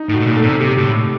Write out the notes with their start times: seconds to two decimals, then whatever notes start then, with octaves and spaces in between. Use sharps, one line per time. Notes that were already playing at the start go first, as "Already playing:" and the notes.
Already playing: D#4
0.09 A2
0.14 F#4
0.20 A2
0.26 A#2
0.37 A4
0.43 C3
0.60 C3 G4
0.78 A2